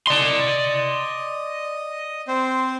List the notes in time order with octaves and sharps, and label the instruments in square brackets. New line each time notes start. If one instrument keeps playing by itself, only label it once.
[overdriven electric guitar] D5 C6 [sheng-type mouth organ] D#5
[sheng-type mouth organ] C4 C5